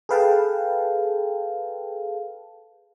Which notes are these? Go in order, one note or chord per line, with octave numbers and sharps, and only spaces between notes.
G#4 A4 B4 F5 G5 A5